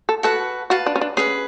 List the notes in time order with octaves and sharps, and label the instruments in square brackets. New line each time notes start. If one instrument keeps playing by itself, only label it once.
[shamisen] A4
[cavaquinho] F#4 B4 F#5 [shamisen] A4
[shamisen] F#4 [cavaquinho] B4 F5 A5
[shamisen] D4
C#4
D4
[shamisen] C#4 [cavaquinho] G#4 B4 F#5